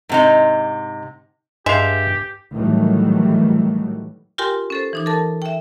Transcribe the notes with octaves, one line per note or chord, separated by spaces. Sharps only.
G#2 C3 D#4
G2 G#3 G4 E5 F5
A2 D#3 E3 F#3 G3 A3
F4 G4 A#4 G5 G#5 C6
C#4 A4 C5
E3 D#4 D6
A4 A#4 A5
E5 G5